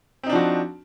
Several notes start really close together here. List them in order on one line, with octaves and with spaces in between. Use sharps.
C4 D#4 D4 F3 F#4